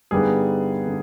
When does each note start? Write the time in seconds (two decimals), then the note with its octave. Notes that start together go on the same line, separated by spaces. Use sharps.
0.11 G2 D3 G3 B3 D#4 G#4
0.87 D3